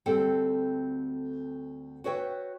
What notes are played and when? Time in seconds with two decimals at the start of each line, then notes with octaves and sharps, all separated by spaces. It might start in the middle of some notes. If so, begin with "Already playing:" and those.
0.06 D2 G3 C4 A4 F#5 G5
2.04 F#4 B4 C#5 E5 G5